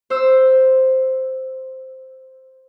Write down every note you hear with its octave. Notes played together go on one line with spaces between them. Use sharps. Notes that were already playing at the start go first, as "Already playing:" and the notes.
C5 E6